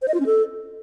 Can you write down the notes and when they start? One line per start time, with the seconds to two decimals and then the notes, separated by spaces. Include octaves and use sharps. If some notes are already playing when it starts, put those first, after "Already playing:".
0.02 C5
0.08 D#5
0.14 F4
0.20 C#4
0.26 A4